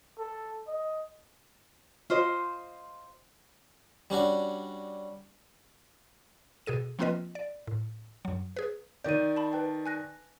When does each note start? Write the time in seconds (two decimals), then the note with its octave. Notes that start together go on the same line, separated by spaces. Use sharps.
0.18 A4
0.68 D#5
2.10 F4 C5 D#5
4.10 G3 C#4 D4 F#4
6.66 B2 G#4 A4 D#7
6.99 F3 A#3 C4 F4 B4 D#5
7.35 D5
7.67 A2
8.25 F#2 F#3
8.56 G#4 B4
9.04 D#3 D5 G6 D#7
9.37 A5 B5
9.52 B4 G5 A5
9.86 G#5 F#6 A#6